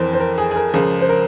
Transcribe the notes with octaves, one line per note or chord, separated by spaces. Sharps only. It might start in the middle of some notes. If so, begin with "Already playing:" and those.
Already playing: F2 E3 A#4 C5
C5
A#4
G#4
G#4
A#4
C#2 C#3 F3 A#4
C5
A#4